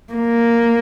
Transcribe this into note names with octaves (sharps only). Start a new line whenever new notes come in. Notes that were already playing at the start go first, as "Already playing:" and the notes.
A#3